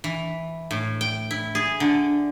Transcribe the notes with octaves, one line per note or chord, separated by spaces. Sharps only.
E3
A2
G5
E4
G#4
D3